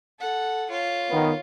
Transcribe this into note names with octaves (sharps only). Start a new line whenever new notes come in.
A4 F#5
F4 C#5
D#3 B3